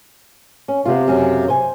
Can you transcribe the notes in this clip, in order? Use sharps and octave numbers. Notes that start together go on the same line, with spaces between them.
C#4
C3 B3 F4
F#2 C#3
C5 G#5